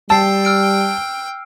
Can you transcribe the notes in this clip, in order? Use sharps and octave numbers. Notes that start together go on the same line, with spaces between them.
G3 G5 A5 E6 C7
E6 F6 D7